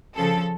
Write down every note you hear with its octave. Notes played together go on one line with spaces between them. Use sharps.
C#3 F3 A4